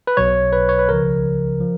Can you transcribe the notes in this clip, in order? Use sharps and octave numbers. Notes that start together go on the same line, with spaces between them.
B4
B1 B2 F#3 C#5
B4
C#5
B4
C#2 C#3 F3 A#4
F3